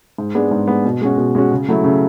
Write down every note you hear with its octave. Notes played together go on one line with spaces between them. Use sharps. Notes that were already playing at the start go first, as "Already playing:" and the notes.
G#2
G#3 B3 D4
G#2
G#3 B3 D4
B2
G#3 C#4 F#4
B2
G#3 C#4 F#4
C#3
F#3 A3 E4
C#3